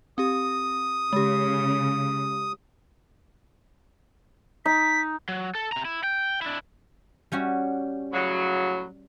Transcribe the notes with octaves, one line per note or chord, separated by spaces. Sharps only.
C4 G4 D#6
C#3 G#3 G4
D#4 B6
F#3
A4
C3 A#5
E4
G5
D4 E4
G3 C#4 F#4
A2 C#3 F#3